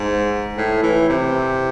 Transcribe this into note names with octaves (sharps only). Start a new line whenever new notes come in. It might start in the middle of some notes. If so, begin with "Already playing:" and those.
Already playing: G#2
A2
E3
C3